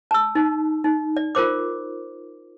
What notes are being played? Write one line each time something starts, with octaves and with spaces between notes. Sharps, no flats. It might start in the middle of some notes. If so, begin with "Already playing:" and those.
A5 E6
D#4
D#4
D5
F4 A#4 C5 D6